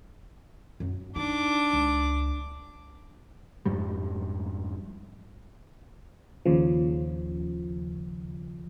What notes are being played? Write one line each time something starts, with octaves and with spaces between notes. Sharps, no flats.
F#2
D4 D#4 D6
C#2
F2 G#2 G3
D#2 C#3 F3